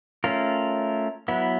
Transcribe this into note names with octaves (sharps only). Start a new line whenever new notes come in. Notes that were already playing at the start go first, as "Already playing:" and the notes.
A3 C#4 F4 A#4
F#3 B3 E4